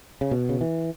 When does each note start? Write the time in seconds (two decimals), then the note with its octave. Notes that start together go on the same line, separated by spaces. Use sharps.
0.21 C#3
0.31 B2
0.49 C#3
0.61 E3